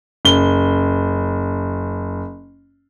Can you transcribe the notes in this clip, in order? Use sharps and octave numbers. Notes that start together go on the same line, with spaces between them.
F#1 G7